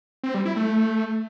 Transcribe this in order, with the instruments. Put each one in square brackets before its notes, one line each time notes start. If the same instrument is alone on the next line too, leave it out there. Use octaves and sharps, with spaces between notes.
[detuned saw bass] C4
G3
E4
A3